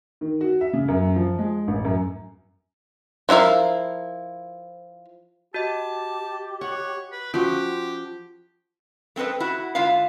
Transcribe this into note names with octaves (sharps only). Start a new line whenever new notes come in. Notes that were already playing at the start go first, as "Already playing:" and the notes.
D#3
F#4
E5
C#3
F#2
F3
G#3
A1
F#2
F3 D4 E4 A#4 F5
F#4 G4 D#5 A5
C#5 F#5
B4
F3 C#4 F#4 G4
A3 C4 A4 B4 D#5
E4 F#4
D3 G#3 F4 E5 F5